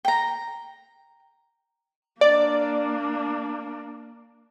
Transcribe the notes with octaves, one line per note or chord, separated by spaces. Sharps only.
G5 A#5
A#3 D4 D5